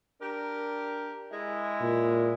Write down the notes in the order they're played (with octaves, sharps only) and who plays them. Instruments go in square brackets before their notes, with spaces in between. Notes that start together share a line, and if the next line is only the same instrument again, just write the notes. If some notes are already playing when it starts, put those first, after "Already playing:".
[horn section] D4 G4 A#4
G#3 E4
[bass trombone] A#2